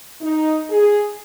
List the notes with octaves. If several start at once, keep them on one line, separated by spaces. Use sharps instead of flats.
D#4
G#4